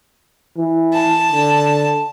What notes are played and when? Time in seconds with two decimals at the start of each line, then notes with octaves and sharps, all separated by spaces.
0.57 E3
0.93 A5
1.31 D3